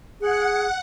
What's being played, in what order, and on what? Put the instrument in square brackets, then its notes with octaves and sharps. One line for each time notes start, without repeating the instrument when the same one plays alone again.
[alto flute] G#4 [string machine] F#5